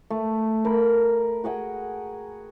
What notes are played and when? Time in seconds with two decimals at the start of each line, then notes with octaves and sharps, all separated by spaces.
0.10 A3
0.65 A#4 B5
1.44 F#4 G#4 F#5 G5